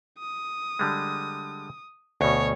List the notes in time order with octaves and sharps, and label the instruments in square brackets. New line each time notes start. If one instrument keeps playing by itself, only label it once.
[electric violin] D#6
[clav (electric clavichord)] D3 G3 G#3
[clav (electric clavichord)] D2 B2 [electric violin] C#5